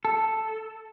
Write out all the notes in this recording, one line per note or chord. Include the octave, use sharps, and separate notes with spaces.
A4